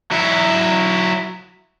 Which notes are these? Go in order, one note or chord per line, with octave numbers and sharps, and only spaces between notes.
F#3 E4